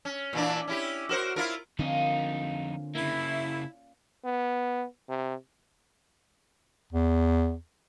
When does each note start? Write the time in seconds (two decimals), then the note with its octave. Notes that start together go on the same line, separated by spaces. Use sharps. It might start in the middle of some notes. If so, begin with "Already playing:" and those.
0.05 C#4
0.33 A#2 E3 D4
0.68 C#4 E4 G4
1.09 F#4 A#4 C5
1.36 E4 F4 A#4
1.79 F2 A#2 D3 C4 C#4 D#4 F4
2.95 C#3 A#3 E4
4.25 B3
5.09 C3
6.92 E2